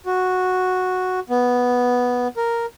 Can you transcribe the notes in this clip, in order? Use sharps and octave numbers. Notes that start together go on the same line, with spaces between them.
F#4
B3
A#4